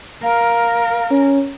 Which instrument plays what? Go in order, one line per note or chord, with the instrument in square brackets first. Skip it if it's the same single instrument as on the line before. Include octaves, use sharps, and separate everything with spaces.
[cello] A#4 [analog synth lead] F5
[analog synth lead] C#4